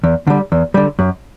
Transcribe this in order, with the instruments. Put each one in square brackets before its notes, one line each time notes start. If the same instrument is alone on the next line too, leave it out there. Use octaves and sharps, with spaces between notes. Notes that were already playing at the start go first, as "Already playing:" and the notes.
[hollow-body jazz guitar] E2
D3 G3
E2
D3 G3
F#2